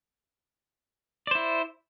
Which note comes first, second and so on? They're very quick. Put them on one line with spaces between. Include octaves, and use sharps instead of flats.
D5 C5 E4